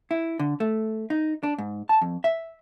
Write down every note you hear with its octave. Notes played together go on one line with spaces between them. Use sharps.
E4
D3
A3
D#4
D4
G#2
A5
F2
E5